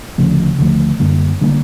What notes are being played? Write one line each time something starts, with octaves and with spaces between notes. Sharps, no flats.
D2 C#3 F3 A3
D2 C#3 F3 A3
F#2 D3 G3 A#3
D3 G3 A#3